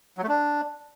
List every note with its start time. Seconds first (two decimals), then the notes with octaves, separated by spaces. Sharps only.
0.18 F#3
0.23 A3
0.28 D4